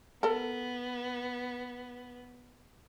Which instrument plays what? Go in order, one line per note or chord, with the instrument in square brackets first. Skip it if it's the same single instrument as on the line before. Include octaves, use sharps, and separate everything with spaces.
[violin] B3 [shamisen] A4 A#4